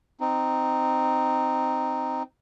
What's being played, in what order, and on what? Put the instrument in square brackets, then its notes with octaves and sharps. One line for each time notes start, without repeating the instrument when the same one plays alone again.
[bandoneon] C4 D#4